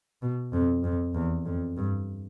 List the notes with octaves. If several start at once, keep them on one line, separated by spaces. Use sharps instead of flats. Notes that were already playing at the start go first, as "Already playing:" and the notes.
B2
F2
F2
E2
F2
G2